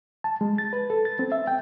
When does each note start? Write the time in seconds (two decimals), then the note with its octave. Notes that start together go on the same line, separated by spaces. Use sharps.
0.24 A5
0.41 G#3
0.58 A6
0.73 B4
0.90 A4
1.05 A6
1.19 C4
1.32 E5
1.47 G5